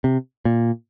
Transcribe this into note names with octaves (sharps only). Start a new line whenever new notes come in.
C3
A#2